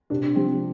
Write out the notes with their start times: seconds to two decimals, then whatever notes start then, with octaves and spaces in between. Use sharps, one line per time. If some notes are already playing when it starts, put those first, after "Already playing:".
0.10 C3 D4
0.35 F3 C4 G4